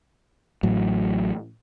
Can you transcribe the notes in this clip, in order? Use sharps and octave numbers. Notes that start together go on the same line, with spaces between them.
A1 A2 F#3